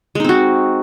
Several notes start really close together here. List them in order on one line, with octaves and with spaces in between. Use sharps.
G#3 D#4 C4 F#4